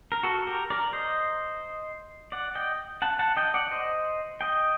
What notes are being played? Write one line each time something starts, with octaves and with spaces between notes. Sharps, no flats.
A#4
F#4 A4
G4 A#4
A#4 D5
C5 D#5
D5 F#5
D#5 G5
F#5 A5
F#5 A5
D#5 G5
D5 F#5
C5 D#5
D#5 G5